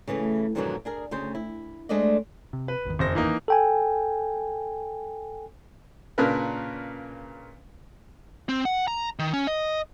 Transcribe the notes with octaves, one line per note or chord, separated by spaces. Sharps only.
C#3 E3 G#3 A3
F2 G#2 B2 D3 D#3 F#3
D4 G#4 A#4
D2 C#3 C5
E4
G#3 A3 D4 C5 D5 D#5
C3
B4
G#1 E2 D#3
F#1 C5 A#6
E3 A#3 D#4
A4 G5 G#5
A#2 C#3 D4 A#4 B4
C4
F#5
A#5
D#3
C#4
D#5